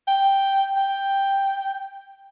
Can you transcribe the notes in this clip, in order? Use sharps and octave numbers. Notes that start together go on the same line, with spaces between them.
G5
G5